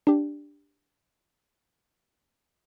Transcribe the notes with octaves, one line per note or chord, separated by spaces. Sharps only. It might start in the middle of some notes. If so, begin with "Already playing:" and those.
D4 G4